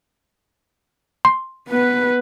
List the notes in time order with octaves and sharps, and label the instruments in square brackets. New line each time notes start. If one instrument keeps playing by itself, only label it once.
[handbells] C6
[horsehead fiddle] B3 B4